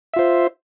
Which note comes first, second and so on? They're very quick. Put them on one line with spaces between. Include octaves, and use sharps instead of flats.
E5 F4 C5